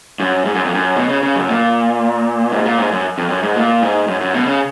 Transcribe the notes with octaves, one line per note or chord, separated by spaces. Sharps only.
F#2
G#2
F#2
F2
F#2
B2
C#3
C#3
F#2
A#2
G#2
A#2
G#2
F#2
F2
F#2
G#2
A#2
G#2
F#2
F#2
B2
C#3